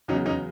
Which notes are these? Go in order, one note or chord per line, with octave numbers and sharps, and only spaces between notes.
E2 C#3 F#3 C#4 D#4
C#4 D#4